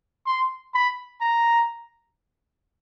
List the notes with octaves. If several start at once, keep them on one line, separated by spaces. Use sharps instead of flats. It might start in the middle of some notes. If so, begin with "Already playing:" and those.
C6
B5
A#5